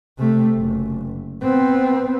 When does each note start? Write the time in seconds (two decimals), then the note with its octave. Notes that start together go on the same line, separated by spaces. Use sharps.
0.19 C3 A3
0.56 F#1
1.43 B3 C4